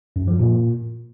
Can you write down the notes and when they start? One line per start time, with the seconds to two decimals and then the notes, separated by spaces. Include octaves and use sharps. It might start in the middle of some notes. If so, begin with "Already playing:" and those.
0.16 F#2
0.28 F3
0.39 A#2